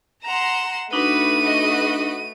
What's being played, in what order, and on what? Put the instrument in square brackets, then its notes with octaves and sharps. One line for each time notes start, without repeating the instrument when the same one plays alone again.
[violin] F#5 E7 [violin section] A#5 C6
[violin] A3 D#7 [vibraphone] D4 D#4 [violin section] F#4 B4
[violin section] F#4 B4 D#5